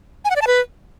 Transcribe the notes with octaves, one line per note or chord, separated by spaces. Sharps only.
G#5
F#5
D5
A5
B4